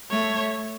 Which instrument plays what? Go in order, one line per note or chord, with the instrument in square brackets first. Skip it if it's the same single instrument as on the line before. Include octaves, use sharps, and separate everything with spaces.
[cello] A3 [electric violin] C#5